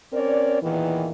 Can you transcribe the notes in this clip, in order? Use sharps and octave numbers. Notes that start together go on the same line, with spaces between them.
C4 C#4 A#4 C#5 D5
E2 A#2 D#3 E3